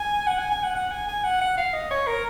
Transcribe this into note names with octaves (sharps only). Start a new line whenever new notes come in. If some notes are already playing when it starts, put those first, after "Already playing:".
Already playing: G#5
F#5
G#5
G#5
F#5
F#5
G#5
G#5
F#5
F#5
F5
D#5
C#5
A#4